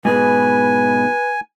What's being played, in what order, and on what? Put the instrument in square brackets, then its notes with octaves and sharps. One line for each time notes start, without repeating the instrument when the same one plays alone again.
[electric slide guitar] G#2 B2 G#4 [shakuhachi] B4 [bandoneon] G#5